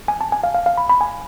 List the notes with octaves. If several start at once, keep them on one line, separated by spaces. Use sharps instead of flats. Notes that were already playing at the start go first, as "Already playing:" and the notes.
G#5
A5
G#5
F5
F5
F5
B5
B5
G#5